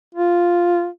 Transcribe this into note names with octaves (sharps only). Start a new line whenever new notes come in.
F4